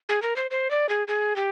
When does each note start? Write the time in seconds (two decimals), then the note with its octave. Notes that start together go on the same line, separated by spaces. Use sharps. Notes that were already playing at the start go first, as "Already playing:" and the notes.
0.09 G#4
0.22 A#4
0.36 C5
0.51 C5
0.71 D5
0.89 G#4
1.08 G#4
1.36 G4